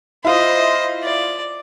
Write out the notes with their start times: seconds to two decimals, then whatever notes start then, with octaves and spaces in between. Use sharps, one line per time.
0.25 E4 F4 C5 D#5
1.04 D5